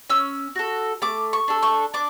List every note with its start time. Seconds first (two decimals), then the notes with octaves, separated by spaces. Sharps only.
0.10 C#4 E6
0.56 F#4 A4
1.02 A3 D6
1.33 C#6
1.48 D4 A4
1.63 C#6
1.94 D4 D6